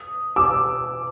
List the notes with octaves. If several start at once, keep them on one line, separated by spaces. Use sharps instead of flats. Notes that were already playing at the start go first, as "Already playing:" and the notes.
Already playing: D#6
D6 E6